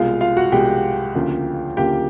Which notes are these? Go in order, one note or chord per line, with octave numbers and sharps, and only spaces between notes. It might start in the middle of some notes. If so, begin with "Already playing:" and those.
Already playing: C2 B2 G#3 F4 F5
F4 F5
F#4 F#5
C2 B2 G#3 G4 G5
D2 C#3 F3 A#3
D2 C#3 F3 A#3 G4 G5